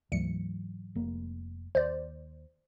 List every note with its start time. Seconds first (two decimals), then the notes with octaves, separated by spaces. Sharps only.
0.12 D2 G#2 E3 F#3 C#7
0.95 F1 G#3 A#3
1.75 D#2 C5 D5